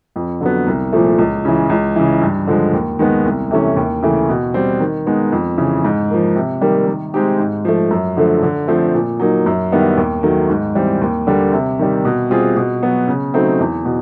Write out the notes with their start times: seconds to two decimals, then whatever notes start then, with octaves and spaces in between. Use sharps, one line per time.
0.16 F2
0.41 D3 F#3 B3
0.67 C2
0.92 A#2 F3 A3
1.18 C#2
1.45 C#3 E3
1.70 C#2
1.96 C#3 E3
2.22 G2
2.47 D3 F3 G#3
2.73 D#2
2.99 D#3 G#3 B3
3.25 C2
3.51 C3 E3 A3 C#4
3.77 D#2
4.03 C#3 E3 A3
4.29 B2
4.54 G3 C4
4.80 D#3
5.07 G#3 B3 D#4
5.32 F2
5.58 C#3 E3
5.85 G#2
6.10 F3 A#3
6.36 C3
6.62 D#3 G3 A#3
6.87 D#3
7.14 G#3 C4 D#4 G4
7.39 G#2
7.65 F3 A3
7.91 F#2
8.17 D3 F3 A3
8.43 D3
8.68 F3 A3 C4
8.95 A#2
9.20 F#3 A#3 D#4
9.46 F#2
9.72 D#3 G3 B3 E4
9.97 D#2
10.23 D#3 F#3 A3
10.50 G#2
10.75 E3 G3 C4
11.01 D#2
11.27 D3 G3 A#3
11.53 C3
11.79 D#3 G3
12.05 B2
12.30 G3 C4 F4 G#4
12.57 B2
12.82 F#3 B3
13.08 C#3
13.34 F#3 A3 C4 D#4
13.60 E2
13.85 B2